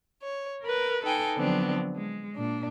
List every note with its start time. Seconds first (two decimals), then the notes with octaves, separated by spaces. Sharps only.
0.22 C#5
0.62 A#4 B4
1.03 D#4 A4 B4 G5 G#5
1.36 D3 F3 F#3 B3 C4 D4
1.95 G#3
2.36 A#2 D4